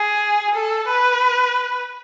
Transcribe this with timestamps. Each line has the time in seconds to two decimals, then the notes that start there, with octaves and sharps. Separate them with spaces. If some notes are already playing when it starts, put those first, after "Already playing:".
Already playing: G#4
0.55 A4
0.88 B4